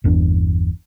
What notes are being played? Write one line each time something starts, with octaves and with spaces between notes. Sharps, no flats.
G1 E2 D4